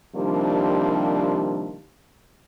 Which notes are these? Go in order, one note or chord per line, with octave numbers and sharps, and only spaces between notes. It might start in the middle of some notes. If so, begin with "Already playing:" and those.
C3 D#3 F3 G3 A#3 D4